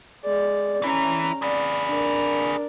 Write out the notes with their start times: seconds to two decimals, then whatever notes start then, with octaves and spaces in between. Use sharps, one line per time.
0.24 G#3 D5
0.82 E3 C#4 E4 A#5
1.42 G#4 B4 D5
1.87 D4 A#4